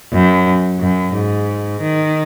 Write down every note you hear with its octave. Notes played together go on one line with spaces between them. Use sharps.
F#2
F#2
G#2
D#3